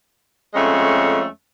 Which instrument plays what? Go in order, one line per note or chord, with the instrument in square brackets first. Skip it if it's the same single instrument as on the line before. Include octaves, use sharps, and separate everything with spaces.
[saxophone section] F2 G#3 A3 C#4